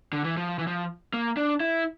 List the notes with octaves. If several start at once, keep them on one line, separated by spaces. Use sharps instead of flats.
D3
E3
F3
E3
F3
A#3
D4
E4